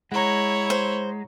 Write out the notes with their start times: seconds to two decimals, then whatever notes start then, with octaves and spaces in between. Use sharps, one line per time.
0.12 G#3 E4 C#5 F#5 A#5
0.70 C5